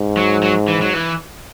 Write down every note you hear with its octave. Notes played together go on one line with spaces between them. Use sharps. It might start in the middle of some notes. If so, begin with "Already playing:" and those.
Already playing: G#2
F#3
F#3
E3
F#3
E3